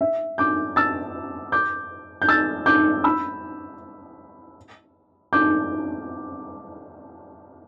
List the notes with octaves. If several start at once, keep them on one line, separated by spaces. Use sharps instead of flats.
E5
D6 G6
E6 A6
D6 G6
G6
E6 A6
D6 G6
B5 E6
D6 G6